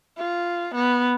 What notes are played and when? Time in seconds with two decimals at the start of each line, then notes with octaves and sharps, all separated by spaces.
0.18 F4
0.75 B3